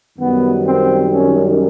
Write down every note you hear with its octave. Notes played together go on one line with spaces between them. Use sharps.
F#2 D#3 G3 B3
C4
C#4